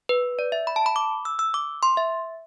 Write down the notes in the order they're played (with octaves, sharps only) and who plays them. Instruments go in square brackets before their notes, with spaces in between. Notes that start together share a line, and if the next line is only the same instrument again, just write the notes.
[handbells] B4
D5
E5
B5
A5
B5
D6
E6
E6
D6
C6
E5